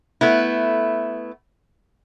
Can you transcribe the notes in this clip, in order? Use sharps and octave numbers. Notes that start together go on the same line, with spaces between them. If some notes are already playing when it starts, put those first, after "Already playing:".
A3 B3 E4